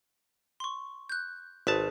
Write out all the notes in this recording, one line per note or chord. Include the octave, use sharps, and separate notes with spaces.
C6 C#6
F#6 G6
G#1 G#4 B4 A5 B6